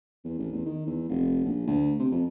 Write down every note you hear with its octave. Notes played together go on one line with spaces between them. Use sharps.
E2
A1
E2
D#3
E2
F1
A#1
D2
C3
F2